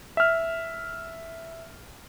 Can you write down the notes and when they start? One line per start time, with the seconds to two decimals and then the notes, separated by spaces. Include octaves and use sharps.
0.17 E5 F6